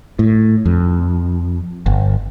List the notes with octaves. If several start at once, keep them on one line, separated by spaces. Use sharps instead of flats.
A2
F2
G1